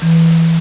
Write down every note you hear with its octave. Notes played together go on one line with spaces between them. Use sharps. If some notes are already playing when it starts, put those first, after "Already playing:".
E3